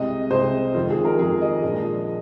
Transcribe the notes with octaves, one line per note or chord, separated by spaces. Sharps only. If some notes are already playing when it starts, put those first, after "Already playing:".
Already playing: C2 C3 G#3 D#5
C2 C3 G#3 C5
F2 D#3 G#3 F4
G#4
A#4
F2 D#3 G#3 G#4
D#5
A#1 A#2 F3 G#3